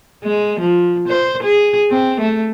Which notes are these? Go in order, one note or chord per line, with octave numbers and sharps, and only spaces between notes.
G#3
F3
C5
G#4
C4
A3